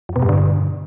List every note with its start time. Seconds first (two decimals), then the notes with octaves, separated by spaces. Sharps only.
0.09 F2
0.16 B2
0.22 G2
0.29 D3